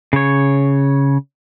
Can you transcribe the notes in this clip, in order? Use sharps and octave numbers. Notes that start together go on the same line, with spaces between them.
C#3 C#5